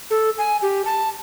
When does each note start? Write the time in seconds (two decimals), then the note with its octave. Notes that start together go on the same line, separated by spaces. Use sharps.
0.10 A4
0.38 G#5
0.62 G4
0.85 A5